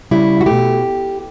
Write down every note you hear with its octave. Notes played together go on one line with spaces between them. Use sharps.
C#3 G3 E4
F#4
B2 A3 G4